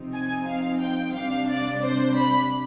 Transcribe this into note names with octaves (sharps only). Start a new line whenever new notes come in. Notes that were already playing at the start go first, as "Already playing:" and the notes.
Already playing: C3 F3 C4 D#4
G#5
F5
G5
C3 G3 D4 F5
D5
C5
B5